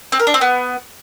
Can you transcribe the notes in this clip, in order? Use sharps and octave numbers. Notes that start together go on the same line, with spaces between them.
C4
A#4
D4
C4
B3